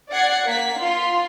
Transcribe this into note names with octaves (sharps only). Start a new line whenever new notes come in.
D5 F#5 G#6 C7
A#3 B6
F4 C6